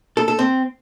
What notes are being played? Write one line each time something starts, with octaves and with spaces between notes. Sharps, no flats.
A4
A4
C4